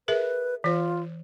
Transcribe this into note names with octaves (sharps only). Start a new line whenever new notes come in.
G#4 A#4 B4 E5
E3 F4 C5